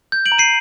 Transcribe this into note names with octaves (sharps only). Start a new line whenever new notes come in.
G6
D7 F#7
A#5
C7 D#7